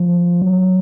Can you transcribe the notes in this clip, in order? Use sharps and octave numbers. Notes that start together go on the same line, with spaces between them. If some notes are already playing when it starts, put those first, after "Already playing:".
Already playing: F3
F#3